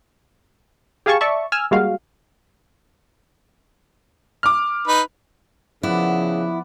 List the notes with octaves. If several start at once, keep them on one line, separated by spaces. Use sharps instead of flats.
G4 G#4 F5 G#5 A5 C#6
D5 E5 A5 C#6
G#5 E6 F6
G3 G#3 A#3 F#4 F5
D6 F6
D#4 B4
C#3 F3 B3 E4 D5 F#5